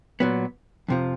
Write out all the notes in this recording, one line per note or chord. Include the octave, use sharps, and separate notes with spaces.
A#2 F#3 B3
F2 C3 F3